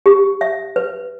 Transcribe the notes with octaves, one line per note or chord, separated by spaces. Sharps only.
G4
E5
B4